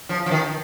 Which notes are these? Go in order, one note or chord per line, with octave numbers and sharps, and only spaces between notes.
F3
F3
D#3